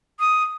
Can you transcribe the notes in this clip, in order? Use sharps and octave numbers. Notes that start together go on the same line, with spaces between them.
D#6